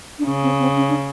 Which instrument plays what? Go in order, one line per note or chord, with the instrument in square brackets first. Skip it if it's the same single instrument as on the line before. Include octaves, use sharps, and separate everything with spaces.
[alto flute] D4
[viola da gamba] C#3 [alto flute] C#4
[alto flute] C4
C4
C#4
D4